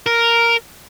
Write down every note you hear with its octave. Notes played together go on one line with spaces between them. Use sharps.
A#4